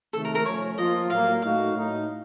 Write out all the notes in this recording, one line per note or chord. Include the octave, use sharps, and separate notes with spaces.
C3 D#3 A3 A4
A#4
A#4
F3 A3 C#4 C#5
F3 A#3 F4 D#5
A2 F#3 A#3 F5
A2 A3 D#4 F#4 F5
A2 A3 D#4